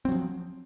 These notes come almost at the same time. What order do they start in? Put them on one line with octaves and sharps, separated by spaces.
C4 F#3 F3